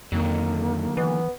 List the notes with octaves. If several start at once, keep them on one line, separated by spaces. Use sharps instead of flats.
F2 D3 D#3 F#3 A#3
E3 B3